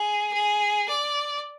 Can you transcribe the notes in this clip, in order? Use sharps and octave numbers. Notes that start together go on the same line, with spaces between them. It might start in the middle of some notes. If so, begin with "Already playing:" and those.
Already playing: G#4
G#4
D5